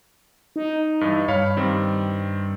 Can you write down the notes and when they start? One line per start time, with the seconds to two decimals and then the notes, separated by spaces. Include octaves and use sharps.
0.56 D#4
1.01 G2 E3
1.28 G2 C#5 F5 B5
1.57 D#3 G3 C4